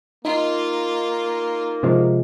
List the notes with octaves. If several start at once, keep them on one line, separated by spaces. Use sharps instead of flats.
A#3 D#4 F4
C3 F3 G#3